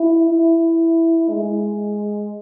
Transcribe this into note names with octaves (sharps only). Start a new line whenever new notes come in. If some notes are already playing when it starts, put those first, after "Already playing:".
Already playing: E4
E4
G#3